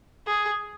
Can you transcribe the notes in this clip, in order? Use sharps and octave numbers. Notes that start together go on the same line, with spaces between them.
G#4